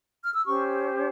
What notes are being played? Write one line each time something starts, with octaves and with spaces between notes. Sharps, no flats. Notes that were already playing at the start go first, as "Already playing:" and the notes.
F6
E6
C#4 G4 C5 C#6